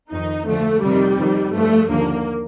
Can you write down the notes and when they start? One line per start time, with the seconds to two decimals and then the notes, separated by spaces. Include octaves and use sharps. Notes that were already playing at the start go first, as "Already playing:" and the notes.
0.12 F2 D#3 D#4
0.47 D2 D3 F3 A3
0.82 F2 C3 D#3 G3
1.18 F2 D#3
1.53 G2 F3 A3
1.88 D#2 D3 F3 A#3